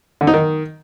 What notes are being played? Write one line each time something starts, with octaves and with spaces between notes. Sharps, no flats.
D3
D#4
D#3